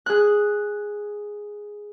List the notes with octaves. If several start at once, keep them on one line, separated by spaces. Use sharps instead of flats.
G#4 F#6